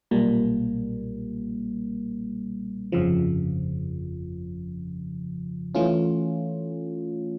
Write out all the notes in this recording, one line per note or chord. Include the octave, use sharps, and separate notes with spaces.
B1 A#2 G3 A#3
G1 F2 C#3 F3
E3 A3 C#4 F4